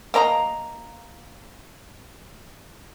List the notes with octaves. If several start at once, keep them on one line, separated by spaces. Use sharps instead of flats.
A#3 D#5 A#5